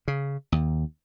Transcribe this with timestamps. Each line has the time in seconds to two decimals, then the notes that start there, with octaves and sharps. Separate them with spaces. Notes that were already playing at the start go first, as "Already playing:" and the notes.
0.08 C#3
0.52 D#2